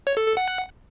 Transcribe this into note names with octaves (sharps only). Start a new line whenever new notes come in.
C#5
A4
A4
F#5